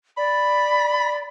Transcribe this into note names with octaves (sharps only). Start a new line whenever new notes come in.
D5 B5